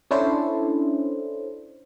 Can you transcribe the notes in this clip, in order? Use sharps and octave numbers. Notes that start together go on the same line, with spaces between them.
C#4 D4 E4 A4 C5